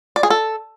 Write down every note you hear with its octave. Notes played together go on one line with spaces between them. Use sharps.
D5
G#4
A4